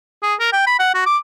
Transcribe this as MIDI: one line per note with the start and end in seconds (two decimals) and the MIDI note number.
0.23 0.35 68
0.40 0.48 70
0.53 0.63 79
0.67 0.79 83
0.79 0.89 78
0.94 1.02 66
1.06 1.17 86